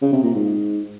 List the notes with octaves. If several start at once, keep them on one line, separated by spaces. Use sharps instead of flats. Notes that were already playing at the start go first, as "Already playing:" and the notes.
C#3
C3
A#2
G#2